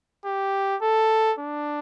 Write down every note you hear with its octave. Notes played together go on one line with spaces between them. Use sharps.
G4
A4
D4